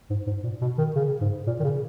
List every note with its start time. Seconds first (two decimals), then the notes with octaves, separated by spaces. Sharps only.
0.10 G#2
0.27 G#2
0.44 A#2
0.61 B2
0.78 D#3
0.96 C#3
1.21 G#2
1.47 A#2
1.60 D#3
1.64 C#3